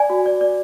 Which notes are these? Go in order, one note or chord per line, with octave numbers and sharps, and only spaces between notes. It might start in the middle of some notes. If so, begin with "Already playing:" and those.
Already playing: D5 G#5
F#4
D5
D5